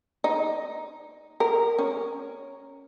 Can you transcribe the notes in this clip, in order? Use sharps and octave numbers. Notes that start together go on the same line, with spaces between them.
D#4
A#4
C#4